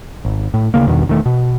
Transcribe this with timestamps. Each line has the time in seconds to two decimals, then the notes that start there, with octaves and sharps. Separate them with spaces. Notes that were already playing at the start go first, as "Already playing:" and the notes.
0.25 G#1
0.54 A2
0.74 D2 C#3 A#3
0.87 E2 G2 B2 D#3
1.07 E1 D#3 A3
1.26 B2